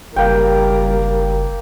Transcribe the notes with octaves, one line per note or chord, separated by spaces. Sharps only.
F#1 G3 A#3 A#4 G5